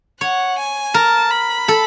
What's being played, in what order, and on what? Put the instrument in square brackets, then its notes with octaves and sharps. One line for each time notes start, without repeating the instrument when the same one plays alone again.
[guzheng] C#5 [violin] F#5
[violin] G#5
[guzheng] A#4 [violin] A5
[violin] B5
[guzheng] A4